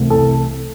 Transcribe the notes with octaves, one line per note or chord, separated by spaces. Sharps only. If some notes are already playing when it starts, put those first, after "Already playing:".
Already playing: C2 C3 E3 A3
A4